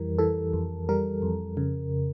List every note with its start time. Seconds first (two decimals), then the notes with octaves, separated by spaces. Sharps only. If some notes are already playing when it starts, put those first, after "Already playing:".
Already playing: F2 E3 G3 A#4
0.19 E3 A4
0.53 F2
0.89 G3 A#4
1.22 F2
1.57 C#3